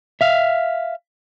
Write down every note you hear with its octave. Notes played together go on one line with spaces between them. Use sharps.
E5 F5